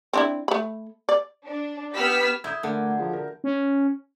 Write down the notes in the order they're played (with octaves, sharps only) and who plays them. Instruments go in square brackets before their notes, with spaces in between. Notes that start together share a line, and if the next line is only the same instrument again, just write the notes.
[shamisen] C4 D4 E4
A3 B5
D5
[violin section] D4
B3 G4 B5 E6 F6 B6
[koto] E4 [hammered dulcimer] E5 [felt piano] D#6 G6 G#6
[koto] D3 [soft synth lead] A3 [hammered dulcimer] A#3 [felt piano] A#4 F#5
[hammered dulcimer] F#3
[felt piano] F3 [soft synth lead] G#4 [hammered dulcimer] G#5 A#5
[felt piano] A#4
[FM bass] C#4